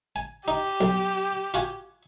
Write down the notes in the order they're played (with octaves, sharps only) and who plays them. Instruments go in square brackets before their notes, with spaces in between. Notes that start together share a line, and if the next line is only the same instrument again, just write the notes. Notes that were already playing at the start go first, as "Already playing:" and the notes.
[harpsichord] G#5
[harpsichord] D#4 [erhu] G4
[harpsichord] B1
F4 F#4 G#5